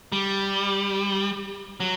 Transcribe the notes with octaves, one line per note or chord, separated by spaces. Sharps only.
G3
F#3